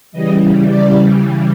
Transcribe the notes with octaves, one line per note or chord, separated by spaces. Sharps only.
C#3 E3 G3 D#5
D5